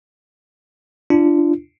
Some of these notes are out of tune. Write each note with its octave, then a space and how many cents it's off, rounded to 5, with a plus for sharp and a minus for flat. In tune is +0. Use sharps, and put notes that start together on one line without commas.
D4 +0 F4 -35